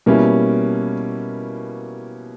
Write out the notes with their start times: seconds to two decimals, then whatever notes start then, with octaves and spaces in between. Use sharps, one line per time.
0.06 B2 G3 A#3 C#4 E4